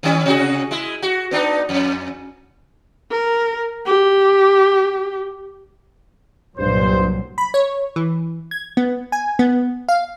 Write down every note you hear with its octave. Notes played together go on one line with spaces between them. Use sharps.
D#3 G3 C#4
C3 F#4 G#4
G#3 E4
F#4
B3 D4 D#4
F2
A#4
G4
C2 G2 A#2 F#3 C5
B5
C#5
E3
G#6
B3
G#5
B3
F5